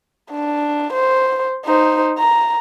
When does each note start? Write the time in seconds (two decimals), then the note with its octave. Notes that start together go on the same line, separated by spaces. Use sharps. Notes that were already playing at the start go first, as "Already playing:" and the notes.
0.31 D4
0.92 C5
1.65 D#4 C5
2.18 A#5